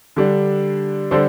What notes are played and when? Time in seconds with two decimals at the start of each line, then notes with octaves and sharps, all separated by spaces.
0.16 D3 G3 D4
1.11 D3 G3 D4 A4 C5